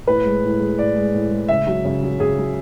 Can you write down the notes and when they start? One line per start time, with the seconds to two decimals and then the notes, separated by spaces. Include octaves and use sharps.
0.07 A2 B4
0.25 G#3
0.43 A2
0.60 G#3
0.79 A2 D5
0.96 G#3
1.14 A2
1.31 G#3
1.48 C#3 E5
1.67 F#3
1.85 C#3
2.03 F#3
2.20 C#3 G#4
2.38 F#3